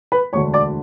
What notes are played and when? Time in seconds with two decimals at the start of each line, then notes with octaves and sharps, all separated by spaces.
0.12 B4 B5
0.33 E1 D2 D3 C#5 C#6
0.54 D5 D6